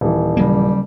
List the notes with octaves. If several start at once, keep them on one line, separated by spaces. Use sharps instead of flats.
D#1 E3
C#3 F#3 G3 A#3